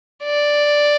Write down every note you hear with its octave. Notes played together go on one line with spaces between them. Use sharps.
D5